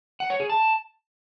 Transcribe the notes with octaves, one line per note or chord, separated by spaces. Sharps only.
F#5
C#5
G#4
A5